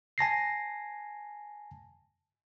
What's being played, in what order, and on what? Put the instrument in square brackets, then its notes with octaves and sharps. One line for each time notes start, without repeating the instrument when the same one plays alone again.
[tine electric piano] G#5 A5 A#6 C7